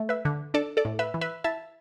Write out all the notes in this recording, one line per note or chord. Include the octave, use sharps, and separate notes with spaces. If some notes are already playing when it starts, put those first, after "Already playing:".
Already playing: A3
B4 E5
D3
D4 A4 D5
A4 D5
A2
B4 E5
E3
B4 E5
E4 E5 A5